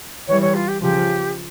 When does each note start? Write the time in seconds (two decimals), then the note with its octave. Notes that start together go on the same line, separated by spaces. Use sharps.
0.28 E3 G3 C#5
0.41 C#5
0.55 F4
0.68 G4
0.81 C#3 F3 G4